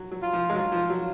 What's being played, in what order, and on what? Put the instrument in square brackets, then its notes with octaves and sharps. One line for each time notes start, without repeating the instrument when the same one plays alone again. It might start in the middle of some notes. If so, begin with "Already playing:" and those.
Already playing: [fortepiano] F#3
F#3
[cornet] F4
[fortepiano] F3
G#3
[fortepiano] F#3 [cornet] F4
[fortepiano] F3
F#3